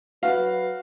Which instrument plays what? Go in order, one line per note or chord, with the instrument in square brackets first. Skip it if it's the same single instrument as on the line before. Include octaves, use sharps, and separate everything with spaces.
[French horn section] F#3 B4 [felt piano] F#4 F5